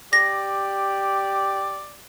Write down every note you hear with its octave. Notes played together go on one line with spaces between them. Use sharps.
G4 D5 A#6